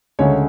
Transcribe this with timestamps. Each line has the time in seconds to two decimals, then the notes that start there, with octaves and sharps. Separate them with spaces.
0.19 D2 C#3 G#3 C#5